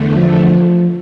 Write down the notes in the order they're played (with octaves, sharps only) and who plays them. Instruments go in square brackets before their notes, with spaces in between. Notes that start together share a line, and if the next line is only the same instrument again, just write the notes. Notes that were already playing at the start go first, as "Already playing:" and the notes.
Already playing: [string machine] E2 D3 A3
[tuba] F3